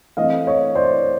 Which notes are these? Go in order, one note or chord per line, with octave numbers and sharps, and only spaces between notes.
E3 A3 C4 D#5 F5
C#5 D#5
C5 D5